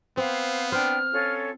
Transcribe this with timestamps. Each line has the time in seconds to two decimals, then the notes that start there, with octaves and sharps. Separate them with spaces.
0.17 B3 C4 C5 F5
0.72 D4 C5 G5 F6
1.11 C#4 F4 A4